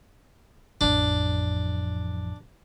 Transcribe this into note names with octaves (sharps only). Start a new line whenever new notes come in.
A1 F2 D4